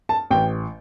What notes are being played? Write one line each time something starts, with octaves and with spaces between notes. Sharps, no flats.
A5
A1 G5